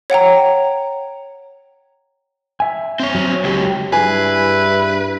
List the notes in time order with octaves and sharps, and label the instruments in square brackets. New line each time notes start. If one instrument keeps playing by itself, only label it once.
[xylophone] C#5 F#5 G5 A#5
[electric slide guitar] E5 G#5
[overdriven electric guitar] C4 C#5
[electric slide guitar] F#3
[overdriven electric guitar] C#2 G4
[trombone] G2 [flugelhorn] E4 [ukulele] G#4 [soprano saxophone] B4